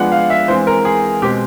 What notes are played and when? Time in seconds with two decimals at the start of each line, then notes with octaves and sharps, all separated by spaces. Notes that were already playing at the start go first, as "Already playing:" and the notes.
Already playing: F3 G#3 B3 D4 F#5
0.12 F5
0.30 E5
0.48 E3 G#3 C4 C5
0.67 A#4
0.85 G#4
1.22 B2 G#3 C4 G4